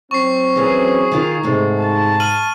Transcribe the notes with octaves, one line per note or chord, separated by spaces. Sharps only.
F#3 C4 C#6 C7
E3 C#4 G#4 A#4
D#3 F4 A#4
G#2 C3 A3
A5
F6 D#7 F#7